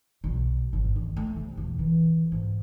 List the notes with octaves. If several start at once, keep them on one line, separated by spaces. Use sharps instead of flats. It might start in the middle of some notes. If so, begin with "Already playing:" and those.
B1
G#1
D#3
A3
C3
E1
E3
G#2